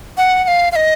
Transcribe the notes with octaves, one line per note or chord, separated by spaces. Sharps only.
F#5
F#5
F5
F5
D#5